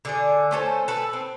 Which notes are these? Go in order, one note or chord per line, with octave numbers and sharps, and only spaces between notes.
D3 G#4 D5
A3 C#4 A4 C5
A4 B4
C4